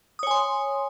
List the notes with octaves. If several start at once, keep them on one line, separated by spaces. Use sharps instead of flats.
C#5 G#5 C6 D#6